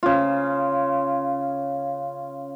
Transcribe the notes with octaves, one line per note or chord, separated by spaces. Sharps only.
C#3 F4